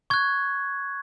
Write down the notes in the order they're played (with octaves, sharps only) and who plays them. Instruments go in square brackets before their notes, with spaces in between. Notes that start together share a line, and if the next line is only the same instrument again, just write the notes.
[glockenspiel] C#6 F#6 G#6